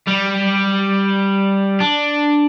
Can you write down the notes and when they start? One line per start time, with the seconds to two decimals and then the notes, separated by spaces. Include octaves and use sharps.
0.07 G3
1.80 D4